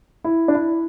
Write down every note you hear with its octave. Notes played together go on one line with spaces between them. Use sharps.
E4
D4
E4